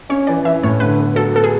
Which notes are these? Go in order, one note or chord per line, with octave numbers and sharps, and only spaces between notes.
C#4 C#5
E3 D5
E3 E5
A2 C#5
D3 B4
B3
F#3 A4
B3 A4
G#4